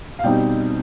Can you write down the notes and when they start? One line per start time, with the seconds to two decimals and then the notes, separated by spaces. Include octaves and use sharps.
0.19 F5
0.23 B2 G3 C4 D#4 G5